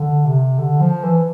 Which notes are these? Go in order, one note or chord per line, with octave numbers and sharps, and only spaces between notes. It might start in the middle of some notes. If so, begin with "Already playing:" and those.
Already playing: D3
C3
D3
F3
E3